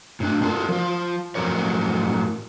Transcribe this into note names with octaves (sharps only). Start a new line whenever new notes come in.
A2 D4
D4 F4 G4 A4 A#4
F3 F4
A2 F3 F#3 A3 A#4 C#5